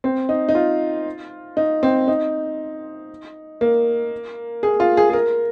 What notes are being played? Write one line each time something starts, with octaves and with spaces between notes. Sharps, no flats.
C4
D#4
D#4
F4
D#4
C4
D#4
A#3
G#4
F4
G#4
G#4
A#4